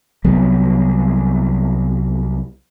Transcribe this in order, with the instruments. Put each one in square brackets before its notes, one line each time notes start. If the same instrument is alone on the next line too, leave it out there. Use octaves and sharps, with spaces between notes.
[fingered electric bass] C2 F#3 G3 B3